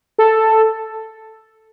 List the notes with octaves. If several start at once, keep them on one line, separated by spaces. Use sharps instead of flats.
A4